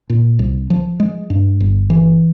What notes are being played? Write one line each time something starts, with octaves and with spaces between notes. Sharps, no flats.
A#2
C2
F3
G#3
G2
G1
E3